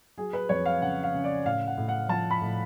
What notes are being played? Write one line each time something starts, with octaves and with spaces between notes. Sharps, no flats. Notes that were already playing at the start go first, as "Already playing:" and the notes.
F#3 G#4
B4
F2 C#5
F5
C#3 F#5
F5
C#3
D5
A2 F5
F#5
A2
F#5
F3 A5
B5
A2